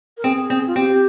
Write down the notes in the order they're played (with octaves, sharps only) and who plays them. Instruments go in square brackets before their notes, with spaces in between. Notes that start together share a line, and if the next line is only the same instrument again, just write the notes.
[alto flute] A#4
[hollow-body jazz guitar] C4 [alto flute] G#4
[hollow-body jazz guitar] C4
[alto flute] F4
[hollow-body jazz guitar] C4 [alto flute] G4